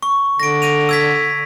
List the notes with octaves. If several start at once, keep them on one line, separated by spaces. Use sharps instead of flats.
C#6
D3 A#6 D7
A#6 D#7 F7
E6 G#6 B6